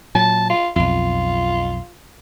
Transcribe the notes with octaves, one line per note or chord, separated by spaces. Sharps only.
A#2 F#3 A5
F4
B1 F2 F4